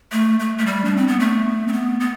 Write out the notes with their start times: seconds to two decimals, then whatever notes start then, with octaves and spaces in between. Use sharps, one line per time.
0.12 A3
0.39 A3
0.58 A3
0.66 G3
0.85 D4
0.97 C4
1.08 B3
1.20 A3
1.68 C4
1.73 B3
2.00 B3